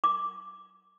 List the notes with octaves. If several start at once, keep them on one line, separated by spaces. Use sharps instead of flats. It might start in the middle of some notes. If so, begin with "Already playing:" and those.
D6